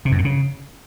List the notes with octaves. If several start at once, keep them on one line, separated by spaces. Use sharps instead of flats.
C3
F#2
A#2
C#3